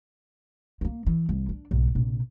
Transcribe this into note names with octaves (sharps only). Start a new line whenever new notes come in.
A#3 B3
E3
C2
D4
B1 G#2
A#1 C3